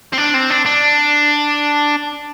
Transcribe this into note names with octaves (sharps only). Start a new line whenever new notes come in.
C4
D4
C4
D4
D4